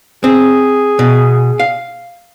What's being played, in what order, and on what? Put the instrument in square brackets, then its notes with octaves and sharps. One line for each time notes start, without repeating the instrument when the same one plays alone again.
[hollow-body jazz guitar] C4 [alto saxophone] G#4
[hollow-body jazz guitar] B2
F5